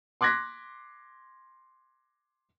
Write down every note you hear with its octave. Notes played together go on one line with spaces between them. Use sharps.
C6 D6 F#6 G#6 A#6 B6